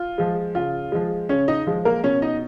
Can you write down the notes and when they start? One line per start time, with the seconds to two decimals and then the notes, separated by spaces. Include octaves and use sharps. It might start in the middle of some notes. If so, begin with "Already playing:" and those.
Already playing: F4
0.18 F3 G#3
0.55 C#3 F4
0.92 F3 G#3
1.29 C#3 C#4 C#5
1.48 D#4 D#5
1.67 F3 G#3
1.85 A#3 A#4
2.04 B2 C#4 C#5
2.22 D#4 D#5